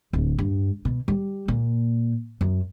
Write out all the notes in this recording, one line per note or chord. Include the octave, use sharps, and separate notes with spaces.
D1
G2
B2
G3
A#2
F#2